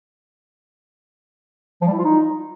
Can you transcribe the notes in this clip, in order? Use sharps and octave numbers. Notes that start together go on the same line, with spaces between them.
F3
G3
E4
F4
D#4